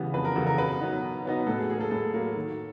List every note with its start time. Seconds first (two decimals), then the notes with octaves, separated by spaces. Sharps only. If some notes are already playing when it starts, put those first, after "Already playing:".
Already playing: C#3 E3 G3 B3
0.14 F2 B4
0.25 A#4
0.36 C#3 E3 G3 B3 A4
0.47 A#4
0.58 B2 B4
0.80 F#3 B3 D#4
1.02 B2
1.25 F#3 B3 D#4
1.47 A2 A4
1.59 G#4
1.69 F#3 G#4
1.74 A#3
1.81 A4
1.91 A2 A4
2.14 F#3 A#3
2.36 D#3